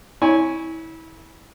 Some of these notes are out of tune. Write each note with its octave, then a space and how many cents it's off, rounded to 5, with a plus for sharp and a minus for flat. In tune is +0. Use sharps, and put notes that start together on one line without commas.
E4 -25 C#5 +0 G#5 +0